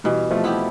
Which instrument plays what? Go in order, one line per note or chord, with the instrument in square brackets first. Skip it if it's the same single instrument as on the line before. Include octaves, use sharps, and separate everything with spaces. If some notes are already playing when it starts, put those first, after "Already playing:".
[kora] B2 [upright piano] E3 G3
[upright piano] F3 A3
[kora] B3 E4 G4